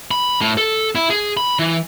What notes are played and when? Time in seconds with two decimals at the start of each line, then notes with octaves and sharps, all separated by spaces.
0.11 B5
0.41 A2
0.57 A4
0.95 E4
1.10 G#4
1.37 B5
1.59 E3